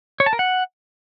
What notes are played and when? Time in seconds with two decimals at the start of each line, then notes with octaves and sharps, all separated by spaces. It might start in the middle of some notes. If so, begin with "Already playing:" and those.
0.20 C#5
0.26 A5
0.33 A#4
0.39 F#5